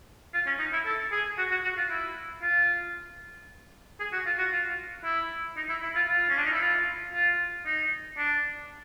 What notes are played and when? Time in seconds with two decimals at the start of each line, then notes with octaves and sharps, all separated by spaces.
0.34 F4
0.46 C#4
0.59 D#4
0.73 E4
0.86 A4
1.12 G#4
1.38 F#4
1.51 F#4
1.64 F#4
1.77 F4
1.90 E4
2.42 F4
4.00 G#4
4.12 F#4
4.26 F4
4.38 F#4
4.52 F4
5.04 E4
5.56 D#4
5.69 E4
5.82 E4
5.95 F4
6.09 F4
6.29 C#4
6.37 D4
6.45 D#4
6.53 E4
6.60 F4
7.13 F4
7.66 D#4
8.17 D4